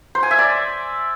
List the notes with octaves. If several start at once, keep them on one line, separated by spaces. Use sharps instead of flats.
C5
G#5
E5
D5